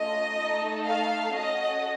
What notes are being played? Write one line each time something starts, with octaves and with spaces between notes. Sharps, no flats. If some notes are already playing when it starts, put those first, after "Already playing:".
Already playing: A3 C#4 F4 A4 D#5
A3 D#4 A4
F5
C#4 F#4 A4 D#5